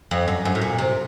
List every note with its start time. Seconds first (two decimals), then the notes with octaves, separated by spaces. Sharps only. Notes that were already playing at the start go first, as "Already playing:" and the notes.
0.11 F2
0.28 F#2
0.45 F#2
0.55 A2
0.61 A#2
0.78 C3